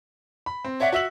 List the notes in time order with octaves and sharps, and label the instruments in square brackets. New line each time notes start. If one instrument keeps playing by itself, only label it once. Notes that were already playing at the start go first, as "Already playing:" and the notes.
[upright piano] B5
C4
[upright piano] C#5 D5 F#5 [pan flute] E5
[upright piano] F#4 E6 F#7 [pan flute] E5